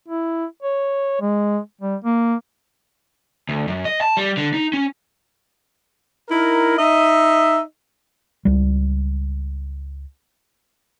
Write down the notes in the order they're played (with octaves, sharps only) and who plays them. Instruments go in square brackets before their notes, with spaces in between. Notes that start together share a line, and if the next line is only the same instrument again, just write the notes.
[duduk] E4
C#5
G#3
G3
A#3
[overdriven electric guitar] D2
F#2
D#5
A5
G3
D3
D#4
C#4
[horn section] D#4 E4 A#4
D#4 D#5 E5
[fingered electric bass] C#2 G3